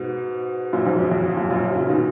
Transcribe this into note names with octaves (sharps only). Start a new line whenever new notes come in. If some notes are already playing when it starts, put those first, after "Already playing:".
Already playing: G#2 B2
F#2 A#2
F2 G#2
F#2
F2
F#2 A#2
F#2 A#2
F#2
A#2 C#3
B2 D#3